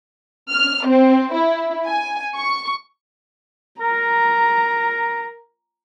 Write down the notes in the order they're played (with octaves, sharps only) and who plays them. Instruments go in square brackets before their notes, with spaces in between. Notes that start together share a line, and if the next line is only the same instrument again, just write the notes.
[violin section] F6
C4
E4
G#5
C#6
[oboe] A#4 [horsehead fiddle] A#5